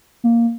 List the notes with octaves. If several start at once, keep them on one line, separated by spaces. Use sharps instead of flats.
A#3